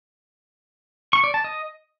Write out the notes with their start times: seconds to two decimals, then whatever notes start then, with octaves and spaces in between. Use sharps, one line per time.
1.13 C#6
1.24 D5
1.34 A5
1.44 D#5